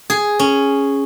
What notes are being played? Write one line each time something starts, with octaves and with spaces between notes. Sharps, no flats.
G#4
C#4